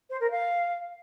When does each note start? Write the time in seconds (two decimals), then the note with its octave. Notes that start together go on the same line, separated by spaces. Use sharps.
0.10 C5
0.20 A#4
0.31 F5